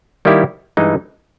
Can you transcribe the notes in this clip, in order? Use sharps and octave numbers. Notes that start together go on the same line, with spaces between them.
D#3 G3 A#3 E4 G4
G2 E3 G#3 D#4